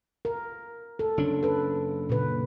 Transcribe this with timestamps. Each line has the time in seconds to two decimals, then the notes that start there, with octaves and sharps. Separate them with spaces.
0.25 A#4
0.99 A4
1.17 F#1 C#4 D4
1.43 A4 B4
2.09 A#2 C#3 B4